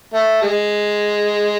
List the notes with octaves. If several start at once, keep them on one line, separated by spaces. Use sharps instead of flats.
A3
G#3